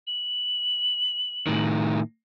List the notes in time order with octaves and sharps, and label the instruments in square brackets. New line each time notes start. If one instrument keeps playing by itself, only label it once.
[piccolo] F#7
[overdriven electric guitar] A2 D#3